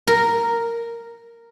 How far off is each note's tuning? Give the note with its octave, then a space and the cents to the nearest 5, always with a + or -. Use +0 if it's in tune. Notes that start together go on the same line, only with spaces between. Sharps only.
A#4 -5